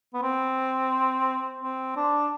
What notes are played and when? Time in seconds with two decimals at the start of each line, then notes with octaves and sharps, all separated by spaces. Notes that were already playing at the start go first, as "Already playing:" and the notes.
0.14 B3
0.22 C4
1.61 C4
1.96 D4